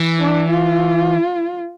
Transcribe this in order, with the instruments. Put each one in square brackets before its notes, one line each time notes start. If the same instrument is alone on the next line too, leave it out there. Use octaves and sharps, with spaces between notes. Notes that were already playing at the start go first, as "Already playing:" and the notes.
Already playing: [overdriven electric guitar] E3
[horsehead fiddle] D4
F4